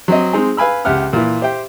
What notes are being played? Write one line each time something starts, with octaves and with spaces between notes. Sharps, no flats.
F#3 C4 D#5
G#3 C4 D#4 G#4
B4 F5 G#5 B5 E6
C#2 G4 E5 F#5 F6
A#2 E3
G4 C5 E5 G5